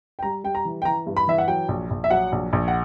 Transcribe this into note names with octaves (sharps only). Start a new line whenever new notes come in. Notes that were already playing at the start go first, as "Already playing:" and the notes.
G5
G3 A#5
G3 G5
A#5
E3
G5
E3 A#5
G2
B5
E3 E5
F#5
F#3 G5
A#1
A#1
E5
F#3 F#5
A#1
A#1
F#5